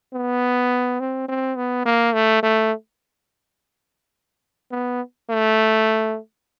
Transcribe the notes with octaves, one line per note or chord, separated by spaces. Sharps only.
B3
C4
C4
B3
A#3
A3
A3
B3
A3